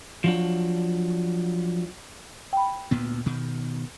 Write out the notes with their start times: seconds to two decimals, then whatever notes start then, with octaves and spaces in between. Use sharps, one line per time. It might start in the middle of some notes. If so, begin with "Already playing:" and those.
0.24 F3 F#3 D4
2.53 G5 B5
2.91 D2 A#2 B3
3.26 B2 D#3